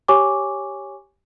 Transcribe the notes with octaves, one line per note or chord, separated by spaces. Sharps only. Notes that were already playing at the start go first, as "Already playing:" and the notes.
G4 C#5 G#5 C#6 D6